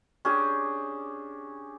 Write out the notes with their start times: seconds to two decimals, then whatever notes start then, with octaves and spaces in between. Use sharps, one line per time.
0.25 C#4 D4 G4 G#4